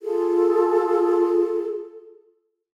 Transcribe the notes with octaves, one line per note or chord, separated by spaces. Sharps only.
F4 G#4 A4